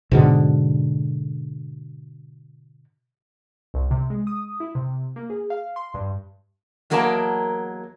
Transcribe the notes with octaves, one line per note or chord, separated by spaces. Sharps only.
G#2 B2 D3
C2
C3
G#3
D#6
E4
C3
A#3
G#4
F5
C6
G2
E2 F#3 A#3 A#4 D#5 A5